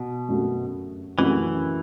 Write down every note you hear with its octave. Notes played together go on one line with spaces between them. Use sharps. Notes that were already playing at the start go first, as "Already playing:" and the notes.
Already playing: B2
F#2 F#3 A3 F#4
F#2 E3 F#3 A3 F#4